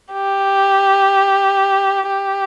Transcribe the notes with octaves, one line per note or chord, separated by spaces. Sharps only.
G4
G4